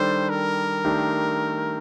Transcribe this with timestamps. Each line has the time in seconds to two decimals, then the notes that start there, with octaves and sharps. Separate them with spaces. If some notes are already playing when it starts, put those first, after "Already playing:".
Already playing: D#3 G3 D4 A4 C5
0.29 A#4
0.84 D#3 A3 D4 G4